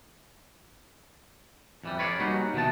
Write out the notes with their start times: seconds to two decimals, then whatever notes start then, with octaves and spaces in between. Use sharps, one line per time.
1.84 F2 E3 G3
1.99 B4 C#5 D5 F5
2.19 G3 A#3 C#4 D#4 F#4
2.54 B2 D#3 E3 A5